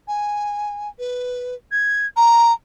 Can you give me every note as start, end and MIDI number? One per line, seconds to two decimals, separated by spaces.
0.08 0.88 80
0.99 1.54 71
1.72 2.06 92
2.16 2.52 82